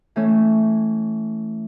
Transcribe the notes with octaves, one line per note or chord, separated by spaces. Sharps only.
E3 A3 C#4